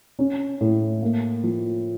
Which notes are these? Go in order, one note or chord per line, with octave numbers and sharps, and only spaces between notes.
C#4
A2
A#3
F3